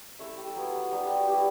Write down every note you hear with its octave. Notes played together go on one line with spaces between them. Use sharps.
A3 E4 E5
G4
F#3 B3 E4
F#3 B3 D4 G4
G4
F#4
G3 B3 E4 G4